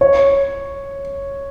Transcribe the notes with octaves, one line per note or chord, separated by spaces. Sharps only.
C#5